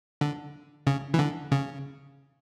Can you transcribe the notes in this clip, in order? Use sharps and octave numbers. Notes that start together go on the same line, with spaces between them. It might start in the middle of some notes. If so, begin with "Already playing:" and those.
D3
C#3
E3
D3
C#3